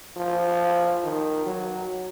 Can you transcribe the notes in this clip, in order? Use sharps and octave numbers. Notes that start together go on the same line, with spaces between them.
F3
D#3
F#3